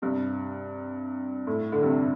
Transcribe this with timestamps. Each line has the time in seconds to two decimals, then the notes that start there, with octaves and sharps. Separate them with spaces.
0.02 G2 C3
1.47 A2
1.72 D3
1.83 G2 C3